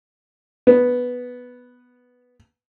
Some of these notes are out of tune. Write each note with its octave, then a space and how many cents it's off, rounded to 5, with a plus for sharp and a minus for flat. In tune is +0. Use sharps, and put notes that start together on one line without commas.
B3 +0